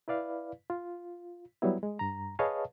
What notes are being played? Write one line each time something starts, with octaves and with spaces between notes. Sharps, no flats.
E4 B4 D5 F5
F4
F#3 G3 B3 E4
G#3
G2 A#5
G#4 B4 C#5 D#5 F5 A5